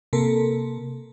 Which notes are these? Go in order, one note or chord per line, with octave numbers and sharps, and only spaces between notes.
C3 A#3 A4 A#4